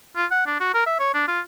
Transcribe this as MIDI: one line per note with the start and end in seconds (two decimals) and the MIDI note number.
0.16 0.26 65
0.32 0.43 78
0.47 0.55 62
0.60 0.73 66
0.74 0.82 70
0.86 0.96 76
1.00 1.13 73
1.15 1.27 62
1.28 1.41 65